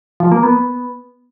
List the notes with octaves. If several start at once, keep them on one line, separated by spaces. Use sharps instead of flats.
F3
A#3
B3